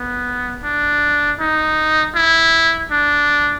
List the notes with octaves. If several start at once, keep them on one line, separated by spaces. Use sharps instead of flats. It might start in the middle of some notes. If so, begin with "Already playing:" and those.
Already playing: B3
D4
D#4
E4
D4